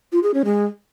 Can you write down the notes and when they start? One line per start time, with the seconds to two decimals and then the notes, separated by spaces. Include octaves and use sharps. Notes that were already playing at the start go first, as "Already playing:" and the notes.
0.12 F4
0.23 G#4
0.34 C#4
0.45 G#3